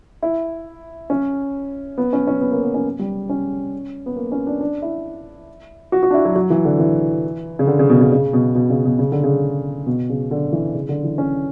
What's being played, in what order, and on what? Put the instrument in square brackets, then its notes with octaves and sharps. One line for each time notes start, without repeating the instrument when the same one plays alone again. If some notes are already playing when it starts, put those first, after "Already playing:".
[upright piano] E4
C#4
B3
C#4
C#4
B3
A#3
B3
C#4
G3
C#4
B3
A#3
C#4
D4
D4
E4
F#4
F#4
D4
E4
F#3
F#3
E3
D3
E3
C#3
D3
C#3
B2
C#3
C#3
B2
B2
C#3
B2
C#3
D3
C#3
B2
C#3
D3
E3
C#3
D3
E3
C#4